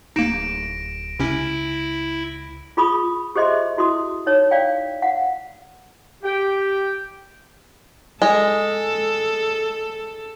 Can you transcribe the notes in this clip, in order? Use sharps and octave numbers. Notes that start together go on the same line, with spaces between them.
D1 A#3 D#4 A#6 D7 E7
C#2 C3 C#4 E4
F4 G#4 B5 C#6 D#6
G4 G#4 C5 D#5 E5 C6
E4 F#4 C6 D#6
D#4 C#5
D5 F5 G5
F5 F#5
G4 G5
G#3 A4